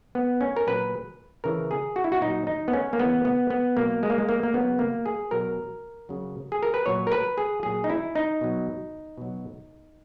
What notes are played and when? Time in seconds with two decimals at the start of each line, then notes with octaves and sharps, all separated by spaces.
0.15 B3
0.41 C#4
0.56 A#4
0.67 A#2 F#3 B4
1.44 C#3 E3 A#4
1.71 G#4
1.96 F#4
2.04 E4
2.12 F#4
2.21 A#2 F#3 D#4
2.47 D#4
2.68 B3
2.73 C#4
2.93 A#3
2.99 C#3 E3 B3
3.25 B3
3.50 B3
3.77 B2 F#3 A#3
4.03 G#3
4.10 A#3
4.18 G#3
4.29 A#3
4.43 A#3
4.53 C#3 F#3 B3
4.79 A#3
5.06 G#4
5.31 B2 F#3 A#4
6.09 C#3 F#3
6.52 G#4
6.63 A#4
6.74 B4
6.86 A#2 F#3 C#5
7.07 A#4
7.12 B4
7.38 G#4
7.63 A#2 F#3 G#4
7.84 D#4
7.90 E4
8.15 D#4
8.41 B2 F#3
9.18 B2 F#3